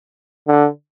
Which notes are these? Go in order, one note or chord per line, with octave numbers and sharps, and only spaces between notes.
D3